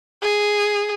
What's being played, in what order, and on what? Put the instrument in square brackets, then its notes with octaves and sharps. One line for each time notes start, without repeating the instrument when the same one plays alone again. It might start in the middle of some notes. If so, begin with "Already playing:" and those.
[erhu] G#4